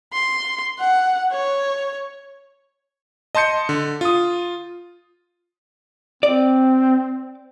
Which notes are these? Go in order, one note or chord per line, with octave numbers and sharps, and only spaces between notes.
C6
F#5
C#5
D#5 A5 C6 G6 C#7
D3
F4 D#6
C4 D5